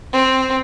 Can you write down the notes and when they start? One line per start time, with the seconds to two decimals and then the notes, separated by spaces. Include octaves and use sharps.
0.13 C4